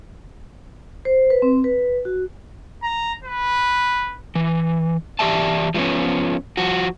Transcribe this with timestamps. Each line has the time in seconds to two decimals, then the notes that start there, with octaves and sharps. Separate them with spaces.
1.05 C5
1.30 B4
1.42 C4
1.64 B4
2.05 F#4
2.83 A#5
3.24 B4
4.35 E3
5.19 E3 G4 D5 E5 A5
5.74 F3 G#3 A3 B3 C#4
6.57 F3 F#4